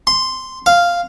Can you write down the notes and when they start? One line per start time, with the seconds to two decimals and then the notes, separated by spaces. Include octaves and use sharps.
0.07 C6
0.66 F5